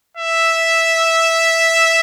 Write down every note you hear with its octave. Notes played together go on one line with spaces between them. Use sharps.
E5